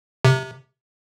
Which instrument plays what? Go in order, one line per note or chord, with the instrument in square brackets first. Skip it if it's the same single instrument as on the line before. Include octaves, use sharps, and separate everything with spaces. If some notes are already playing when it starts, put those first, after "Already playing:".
[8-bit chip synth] C3